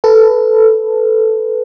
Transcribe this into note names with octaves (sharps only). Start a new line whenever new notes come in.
A4 B4